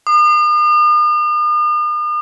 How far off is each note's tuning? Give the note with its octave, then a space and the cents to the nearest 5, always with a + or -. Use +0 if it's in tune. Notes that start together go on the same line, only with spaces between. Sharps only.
D#6 -45